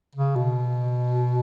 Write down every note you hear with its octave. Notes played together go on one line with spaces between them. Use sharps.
C#3
B2